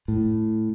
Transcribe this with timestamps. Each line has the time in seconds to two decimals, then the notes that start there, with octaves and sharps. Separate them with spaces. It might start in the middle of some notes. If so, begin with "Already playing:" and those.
0.08 A2